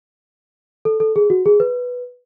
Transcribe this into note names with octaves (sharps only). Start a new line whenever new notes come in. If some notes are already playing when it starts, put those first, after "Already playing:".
A4
A4
G#4
F#4
G#4
B4